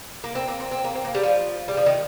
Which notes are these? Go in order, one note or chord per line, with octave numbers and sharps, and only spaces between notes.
A#3
C4
A#3
C4
C4
A#3
C4
A#3
G3
F3
G3
F3
D#3